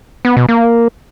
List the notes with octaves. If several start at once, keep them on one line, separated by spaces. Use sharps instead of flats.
B3
B2
A#3